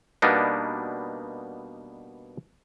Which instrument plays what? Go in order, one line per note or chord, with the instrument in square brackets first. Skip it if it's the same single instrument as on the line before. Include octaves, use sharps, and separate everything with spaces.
[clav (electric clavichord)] B2 G3 A#3 B3 D4 D#4